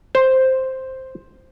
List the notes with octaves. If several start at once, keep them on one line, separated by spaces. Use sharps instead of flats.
C5